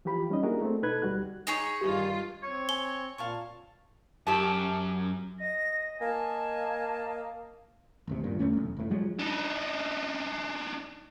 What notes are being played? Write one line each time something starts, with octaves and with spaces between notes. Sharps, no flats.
E3 F3 F4 G4 B5
G3 C#4 D#4 D#5
A#3 D4 E4 F#4 G#4 A#4
A3 C4
B2 D#4 A4 B4 F#6 G#6
D2 G3 F#4 F#6
D#4 G#4 C#5
G2 D#3 F4 G4
C4 C#5
G#5 G7
A#2 F5 A5 C#6
F#2 G4 A5
D#5 A#6
A#3 G#5 A5
G#1 D2 C3
G#1 G2 A#2
E2 D3 A3 C#4
E1 B1
F#1 A2
F3 F#3 G#3
D4 D#4